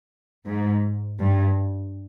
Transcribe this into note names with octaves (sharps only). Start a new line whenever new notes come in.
G#2
G2